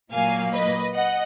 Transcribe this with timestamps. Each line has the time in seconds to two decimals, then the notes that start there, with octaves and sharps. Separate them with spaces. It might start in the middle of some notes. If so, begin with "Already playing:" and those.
0.12 A#2 F#3 A#3 F5 G#5
0.53 B4 D#5
0.94 D#5 F#5